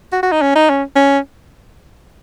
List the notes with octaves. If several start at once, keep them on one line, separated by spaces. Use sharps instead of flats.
F#4
F#4
D#4
C#4
D#4
C#4
C#4